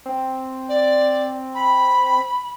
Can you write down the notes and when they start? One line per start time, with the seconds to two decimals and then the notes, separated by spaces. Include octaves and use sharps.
0.06 C4
0.69 D5
1.55 B5